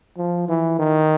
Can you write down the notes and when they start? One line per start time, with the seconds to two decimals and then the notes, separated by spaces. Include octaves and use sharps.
0.17 F3
0.48 E3
0.79 D#3